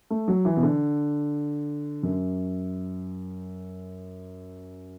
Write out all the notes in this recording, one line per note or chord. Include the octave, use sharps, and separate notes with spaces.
A3
F#3
E3
B2
D3
F#2